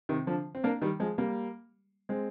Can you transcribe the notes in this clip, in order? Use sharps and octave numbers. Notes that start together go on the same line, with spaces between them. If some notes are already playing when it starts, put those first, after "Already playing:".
C3 D#3
D3 F3
C4
A#3 D4
D#3 G3
F3 G#3
G3 A#3
G#3 C4